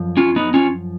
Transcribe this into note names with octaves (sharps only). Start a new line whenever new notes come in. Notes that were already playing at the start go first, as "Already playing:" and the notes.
Already playing: F#2 F3
C#4 F4
B3 D#4
C#4 F4